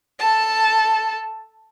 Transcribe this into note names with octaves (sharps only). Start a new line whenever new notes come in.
A4 A5